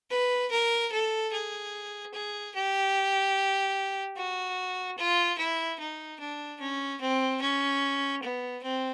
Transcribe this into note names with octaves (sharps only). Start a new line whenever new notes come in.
B4
A#4
A4
G#4
G#4
G4
F#4
F4
E4
D#4
D4
C#4
C4
C#4
B3
C4